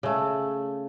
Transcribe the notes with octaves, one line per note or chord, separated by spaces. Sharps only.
C#3 A3